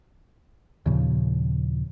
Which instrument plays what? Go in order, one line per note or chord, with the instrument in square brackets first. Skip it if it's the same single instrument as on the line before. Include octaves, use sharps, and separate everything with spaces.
[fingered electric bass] D#2 A#2 C#3 F3